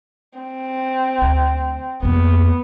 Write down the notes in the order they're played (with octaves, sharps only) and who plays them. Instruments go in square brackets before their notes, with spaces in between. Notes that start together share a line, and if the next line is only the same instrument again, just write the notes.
[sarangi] C4
[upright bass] D2
[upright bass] F2 A#3 [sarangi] B3